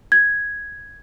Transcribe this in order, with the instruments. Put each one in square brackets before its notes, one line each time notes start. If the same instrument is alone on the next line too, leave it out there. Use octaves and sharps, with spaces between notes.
[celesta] G#6